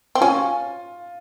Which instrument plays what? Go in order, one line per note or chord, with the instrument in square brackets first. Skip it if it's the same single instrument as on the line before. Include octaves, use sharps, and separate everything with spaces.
[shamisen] C4
[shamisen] C#4 [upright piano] F4